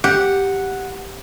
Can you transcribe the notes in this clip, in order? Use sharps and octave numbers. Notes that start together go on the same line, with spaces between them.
G4 F#5